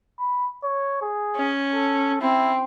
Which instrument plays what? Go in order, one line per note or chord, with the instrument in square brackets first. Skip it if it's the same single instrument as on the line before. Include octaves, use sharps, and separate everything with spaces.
[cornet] B5
C#5
G#4
[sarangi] C#4
[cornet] A4
[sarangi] C4 [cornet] E4